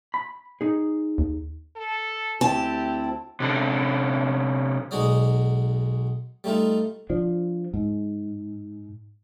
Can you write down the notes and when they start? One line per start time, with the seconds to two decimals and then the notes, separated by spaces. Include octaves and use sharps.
0.14 B5
0.61 D#4 G#4
1.18 D#2
1.76 A4
2.41 D2 C4 E4 G4 A5
3.40 C3 D4 A4
4.91 B1 G#3 D#4 F#4 D5 D#6
6.44 G3 A3 D#4 F4
7.10 F3 D4
7.74 G#2